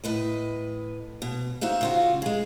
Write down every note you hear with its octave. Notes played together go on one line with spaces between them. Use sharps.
A2 B4 D#5
B2
D#4 F#4 C5 E5 F5
C#3 F4 F#4
G#3 G#4